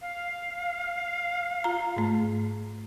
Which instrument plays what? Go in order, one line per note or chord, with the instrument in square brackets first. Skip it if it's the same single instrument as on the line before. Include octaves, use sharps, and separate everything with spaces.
[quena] F5
[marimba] F4 A#5
G#2 A3